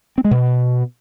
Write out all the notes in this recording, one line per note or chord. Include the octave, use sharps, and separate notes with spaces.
C4
G#3
B2